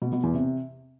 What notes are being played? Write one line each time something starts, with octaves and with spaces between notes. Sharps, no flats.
B2
B2
E2
C3